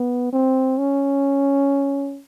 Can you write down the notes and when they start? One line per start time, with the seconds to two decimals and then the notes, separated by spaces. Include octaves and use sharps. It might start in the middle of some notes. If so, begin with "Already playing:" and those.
Already playing: B3
0.33 C4
0.79 C#4